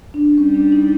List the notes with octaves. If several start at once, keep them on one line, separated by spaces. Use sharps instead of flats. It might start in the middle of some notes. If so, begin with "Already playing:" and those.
D4
G3 C#4
D4
D4
D#4